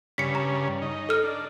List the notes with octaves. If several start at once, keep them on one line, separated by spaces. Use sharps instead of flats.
G2 C#3 B6 C#7
A#5
D#4
A4 F6
D4